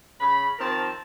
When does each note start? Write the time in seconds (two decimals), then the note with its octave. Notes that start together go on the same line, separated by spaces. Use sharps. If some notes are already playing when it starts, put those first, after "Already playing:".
0.20 C#3 B5
0.59 D#3 F3 C4 A#4 A5